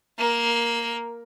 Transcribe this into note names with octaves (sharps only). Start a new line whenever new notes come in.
A#3 A#4